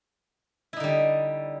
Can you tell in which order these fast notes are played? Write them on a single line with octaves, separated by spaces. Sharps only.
E4 D#4 D3 G3